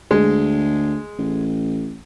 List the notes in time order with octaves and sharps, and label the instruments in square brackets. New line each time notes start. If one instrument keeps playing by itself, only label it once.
[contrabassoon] D2 [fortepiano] G#3
[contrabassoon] A1